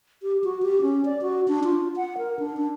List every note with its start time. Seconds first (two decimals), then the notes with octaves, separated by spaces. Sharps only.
0.23 G4
0.44 F#4
0.63 G4
0.82 C#4
1.05 D5
1.22 F#4
1.48 D4
1.64 F4
1.96 F#5
2.18 A#4
2.39 D4
2.57 D4